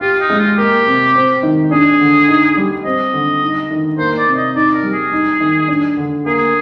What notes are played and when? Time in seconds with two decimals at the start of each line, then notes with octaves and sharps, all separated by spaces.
0.01 F4 G4
0.21 D#4
0.30 G#3
0.39 F4
0.58 A#3 G4
0.86 C3
1.15 C4
1.43 D#3
1.71 D4 G#4
2.01 D3
2.28 D#4
2.57 G3
2.84 C4 D#5
3.14 D3
3.42 D#4
3.71 D#3
3.98 A#3 C5
4.18 D5
4.27 C3
4.36 D#5
4.56 D#4 D5
4.74 A#4
4.83 G3
4.93 G#4
5.13 D#4
5.40 D#3
5.68 D4
5.97 D3
6.25 A#3 G#4